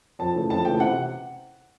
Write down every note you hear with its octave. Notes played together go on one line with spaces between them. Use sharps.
F2 A5
C#3 E3 A3
F2 A5
C#3 E3 A3 G5
C3 F#5